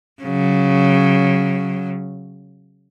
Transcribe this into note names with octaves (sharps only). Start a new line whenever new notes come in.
C#3 F#3